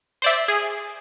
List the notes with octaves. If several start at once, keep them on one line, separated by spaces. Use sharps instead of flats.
C5 D5 E5
G#4